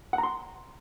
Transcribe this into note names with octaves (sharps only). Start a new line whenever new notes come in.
F#5
A#5
C6